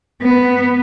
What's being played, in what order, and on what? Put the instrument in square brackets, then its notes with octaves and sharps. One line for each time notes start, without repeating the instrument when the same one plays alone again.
[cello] B3